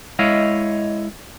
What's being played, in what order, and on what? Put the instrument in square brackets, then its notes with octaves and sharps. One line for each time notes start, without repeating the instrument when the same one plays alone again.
[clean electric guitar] G#3 E4 C#5 D#5 F5